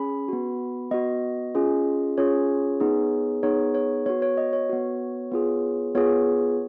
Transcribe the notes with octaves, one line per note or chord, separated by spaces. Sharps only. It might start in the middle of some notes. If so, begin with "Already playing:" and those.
Already playing: C#4 G#4 B5
B3 F#4
B3 F#4 D#5
C#4 F4 G#4
C#4 F4 G#4 C#5
B3 D#4 G#4
B3 D#4 G#4 C#5
C#5
B3 F#4 C#5
C#5
D#5
C#5
B3 F#4
B3 F4 G#4
B3 F4 G#4 C#5